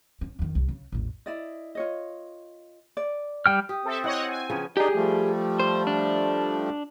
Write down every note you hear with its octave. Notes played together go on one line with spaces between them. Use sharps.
C#4
F2 D#3
C2
C#3
A1 E2
E4 D5 D#5
F4 C#5 D#5
D5
G3 G5 F6
G4 D#6
C4 A4 E5
E4 C#5 D#5 F#5
F#5 G#5
C#3 F3 B3 G5
D4 D#4 G4 G#4
F3 G3 A3
C5
D4